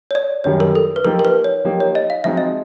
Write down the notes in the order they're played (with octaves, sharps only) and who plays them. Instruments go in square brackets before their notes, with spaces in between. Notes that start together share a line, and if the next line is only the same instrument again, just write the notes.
[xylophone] C#5
D5
[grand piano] F#2 D#3 G3 [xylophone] C#5
[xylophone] A#4
A4
B4
[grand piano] F3 A#3 D#4 G4 [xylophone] A#4
[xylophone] A#4
B4
C#5
[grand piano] F3 A#3 D#4 G4
[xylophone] C#5
D#5
F5
[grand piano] F3 G#3 C4 D#4 F#4 [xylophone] E5
[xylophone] D#5